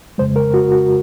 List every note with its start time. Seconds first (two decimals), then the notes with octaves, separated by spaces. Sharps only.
0.18 F2 C#3 G#3 C5
0.36 A#4
0.54 F#4
0.71 F#4